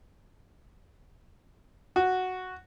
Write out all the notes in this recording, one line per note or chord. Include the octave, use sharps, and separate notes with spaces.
F#4